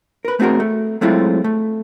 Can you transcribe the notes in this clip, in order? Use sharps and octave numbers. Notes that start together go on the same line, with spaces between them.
A#4 B4
A3 C4 F#4 G#4 A#4
A3
F#3 G#3 A3 C4 E4 F4
A3